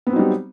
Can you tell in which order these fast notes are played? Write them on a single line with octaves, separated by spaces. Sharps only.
B3 C4 F#3 D#4 G3